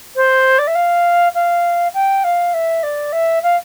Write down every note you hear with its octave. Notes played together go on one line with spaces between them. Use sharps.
C5
D5
E5
F5
F5
G5
F5
E5
D5
E5
F5